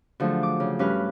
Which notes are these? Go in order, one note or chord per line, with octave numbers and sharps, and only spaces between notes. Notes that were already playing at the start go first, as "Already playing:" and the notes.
D3 F3 F#3 A3 G#4
D6
C#3
G2 C#4 B4 F6 F#6